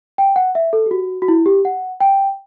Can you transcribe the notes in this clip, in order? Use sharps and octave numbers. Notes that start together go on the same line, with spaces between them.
G5
F#5
E5
A4
G4
F#4
F#4
E4
G4
F#5
G5